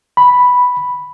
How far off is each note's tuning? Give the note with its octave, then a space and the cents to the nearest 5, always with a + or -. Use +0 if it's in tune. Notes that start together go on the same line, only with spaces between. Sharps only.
B5 +0